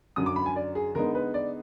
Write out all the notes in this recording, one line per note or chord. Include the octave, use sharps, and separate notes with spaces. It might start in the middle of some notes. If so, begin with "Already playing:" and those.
F#2 D3 F#3 D#6
D6
B5
G#5
D5
G#4
D3 G#3 B3 D#4 A#4
B4
D5